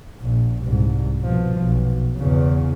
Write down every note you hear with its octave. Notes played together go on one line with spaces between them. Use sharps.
A#1
C2 G#2
B2 F3
B1
E2 C#3